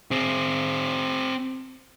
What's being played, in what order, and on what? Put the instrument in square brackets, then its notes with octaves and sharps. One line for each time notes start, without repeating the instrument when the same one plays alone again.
[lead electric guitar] C4 G#4